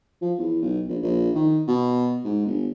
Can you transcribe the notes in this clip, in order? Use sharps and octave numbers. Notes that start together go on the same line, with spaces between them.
F3
E2
B1
A#1
A#1
D#3
B2
G#2
G1